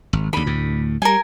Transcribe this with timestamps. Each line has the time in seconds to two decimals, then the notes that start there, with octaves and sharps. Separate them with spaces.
0.13 G#1
0.33 D#2 D3 B5
0.46 D2 A2
1.02 G3 A#4 G#5